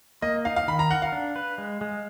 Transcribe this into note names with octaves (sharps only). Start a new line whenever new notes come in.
A#3 D#5
D#4 F5
F5
D#3 B5
A#5
A#4 F#5
F5
D4
B4
G#3
G#3